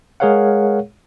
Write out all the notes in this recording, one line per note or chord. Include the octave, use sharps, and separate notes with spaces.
G#3 G#4 A#4 C#5 F5 F#5